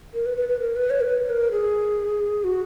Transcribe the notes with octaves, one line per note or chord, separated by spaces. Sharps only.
A#4
B4
B4
B4
A#4
B4
C#5
A#4
B4
A#4
G#4
F#4